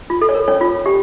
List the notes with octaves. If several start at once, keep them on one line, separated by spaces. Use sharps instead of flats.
F4
A4
C#5
A#4
C#4 C#5
F4
G4